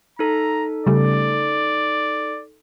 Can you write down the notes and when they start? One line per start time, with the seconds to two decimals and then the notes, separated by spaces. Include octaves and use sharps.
0.19 D#4 A4 A#5
0.86 C#3 G3 A3 D5